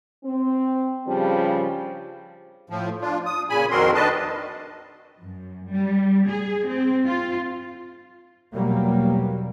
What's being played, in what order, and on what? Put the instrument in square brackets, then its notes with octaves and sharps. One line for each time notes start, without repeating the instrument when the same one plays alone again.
[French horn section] C4
G2 C#3 F3 G3
[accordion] A2 F3
D4 F4
D#6
A#2 C#3 G#5 B5
F2 D#3 C4 F#4 A#4 C6
D#3 D4 B4 D#5 A5
[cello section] F#2
G3
G#4
C4
F4
[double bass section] E2 B2 F#3 G3 A#3